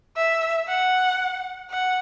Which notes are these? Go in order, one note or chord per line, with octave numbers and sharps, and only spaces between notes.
E5
F#5
F#5